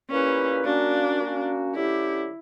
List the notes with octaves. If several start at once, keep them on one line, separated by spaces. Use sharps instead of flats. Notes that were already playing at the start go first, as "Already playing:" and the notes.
A#2 A#3 C#4 E4 G4 B4
A#3 C#4 D4 F#4
A#3 C#4 F#4
D3 F#3 C#4 E4 G4